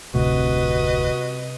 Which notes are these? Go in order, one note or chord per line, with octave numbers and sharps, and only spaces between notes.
F1 D2 A2 C3 F#4 B4 D#5